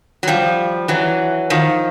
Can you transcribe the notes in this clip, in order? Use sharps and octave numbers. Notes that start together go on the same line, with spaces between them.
F#3
F3 G3
E3 F#3
D#3 F3